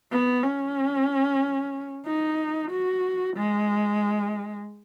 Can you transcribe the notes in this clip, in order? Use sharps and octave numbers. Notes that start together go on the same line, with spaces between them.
B3
C#4
D#4
F#4
G#3